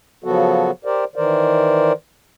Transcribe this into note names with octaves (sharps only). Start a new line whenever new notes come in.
C#3 F3 F#3 B3 F#4 A4
G4 A#4 C5 D5
D#3 E3 A#4 C5 D5